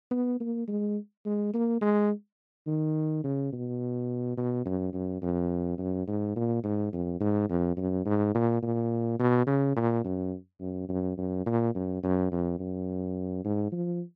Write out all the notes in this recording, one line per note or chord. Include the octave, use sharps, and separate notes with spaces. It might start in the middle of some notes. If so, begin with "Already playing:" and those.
B3
A#3
G#3
G#3
A#3
G#3
D#3
C#3
B2
B2
F#2
F#2
F2
F#2
G#2
A#2
G#2
F2
G#2
F2
F#2
G#2
A#2
A#2
B2
C#3
A#2
F#2
F#2
F#2
F#2
A#2
F#2
F#2
F2
F#2
G#2
F3